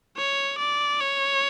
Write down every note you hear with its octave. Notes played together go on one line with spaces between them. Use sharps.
C#5
D5
C#5